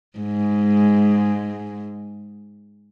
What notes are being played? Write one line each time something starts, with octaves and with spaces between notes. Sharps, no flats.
G#2 G#3